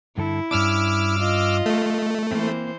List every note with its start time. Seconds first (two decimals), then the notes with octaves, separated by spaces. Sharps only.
0.18 G2 D3 E4 A4
0.51 G2 C#4 D4 D6 E6 F6
1.19 F4 D#5
1.66 A3
2.32 E3 A#3 C4 C5